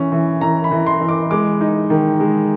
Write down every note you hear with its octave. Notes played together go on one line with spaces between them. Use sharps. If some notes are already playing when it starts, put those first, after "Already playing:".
Already playing: E3 C#4
E3
E3 A#5
B5
E3
C6
E3
D6
G#3 D6
D#4
D#3
G#3